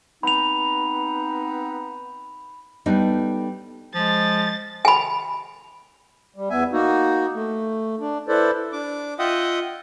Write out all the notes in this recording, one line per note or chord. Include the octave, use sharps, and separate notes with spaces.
B3 C4 D#4 B5 F7
G3 B3 D#4 A4
F3 G#3 A6
G#5 B5
G3
E2 B3 E5 G#5
A#3 D#4 F#4
A3
D4
E4 A4 B4 C5 D5
D4 D6
F4 D#5 E5 F#5 G5 D#6